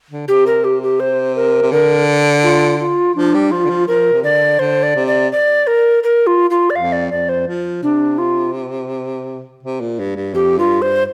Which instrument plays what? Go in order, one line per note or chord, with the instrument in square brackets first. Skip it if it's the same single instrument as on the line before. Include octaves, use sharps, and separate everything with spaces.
[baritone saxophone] D3
[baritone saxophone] C3 [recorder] G4
[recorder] A#4
G4
G4
C5
A#4
[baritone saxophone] C3
[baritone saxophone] D3 [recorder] A#4
[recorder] F4
F4
[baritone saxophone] F3 [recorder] D4
[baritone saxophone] G3
[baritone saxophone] F3 [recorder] F4
[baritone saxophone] D3
F3
[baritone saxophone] F3 [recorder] A#4
[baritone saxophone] C3
[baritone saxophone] D3 [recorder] D5
[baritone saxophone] D3 [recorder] C5
[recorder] D5
[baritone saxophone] C3
[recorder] D5
D5
A#4
A#4
F4
F4
D5
[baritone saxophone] F2 [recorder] F5
[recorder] D5
[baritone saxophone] F2 [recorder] D5
[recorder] C5
[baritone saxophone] F3
[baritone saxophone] C3 [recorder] D4
[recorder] F4
[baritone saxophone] C3
A#2
G2
G2
[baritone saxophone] F2 [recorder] G4
[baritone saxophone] G2 [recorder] F4
[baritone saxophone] G2 [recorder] C5